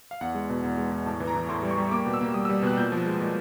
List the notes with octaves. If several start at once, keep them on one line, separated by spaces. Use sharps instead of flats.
F5
E2 F#5
G#3
B2
E2
G#3
E2
A2 A5
E3
A#5
E3
A2 C6
G3
C#6
G3
A#3 D6
B2
E6
A#3
G3 D#6
G3 E6
B2 F#6
A#2 G6
F3
G#3
A#2